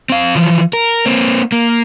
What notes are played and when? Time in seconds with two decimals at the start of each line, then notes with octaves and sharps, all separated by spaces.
0.10 C4 F5
0.35 E3 F3
0.73 A#4
1.06 A#3 C4
1.52 A#3